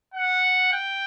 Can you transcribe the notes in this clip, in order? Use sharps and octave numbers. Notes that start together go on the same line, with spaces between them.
F#5
G5